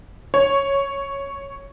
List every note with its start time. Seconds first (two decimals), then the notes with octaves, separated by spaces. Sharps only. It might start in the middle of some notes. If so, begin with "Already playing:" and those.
0.34 C#5